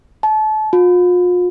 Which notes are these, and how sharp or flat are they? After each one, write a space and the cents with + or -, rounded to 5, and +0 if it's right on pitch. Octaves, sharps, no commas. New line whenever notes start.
A5 -30
F4 +40